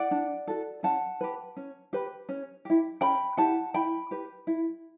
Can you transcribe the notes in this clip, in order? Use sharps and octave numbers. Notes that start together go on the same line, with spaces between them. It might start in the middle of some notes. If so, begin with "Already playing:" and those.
Already playing: D5 F#5
D4
F#4 A4
C#4 F#5 A5
G4 B4
C#4
G4 B4
C#4
E4 G4
C#4 G5 B5
E4 G4 F#5 A5
E4 G5 B5
G4 B4
E4